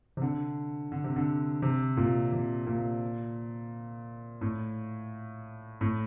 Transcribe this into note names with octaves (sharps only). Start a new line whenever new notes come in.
C3
D3
D3
C3
D3
C3
A#2
C3
A#2
A2
A2